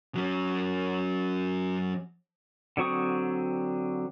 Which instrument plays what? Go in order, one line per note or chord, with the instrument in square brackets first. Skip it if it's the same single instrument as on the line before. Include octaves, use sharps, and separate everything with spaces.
[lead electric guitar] F#3 C#4
[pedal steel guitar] D3 F#3 C4 C#6 D#6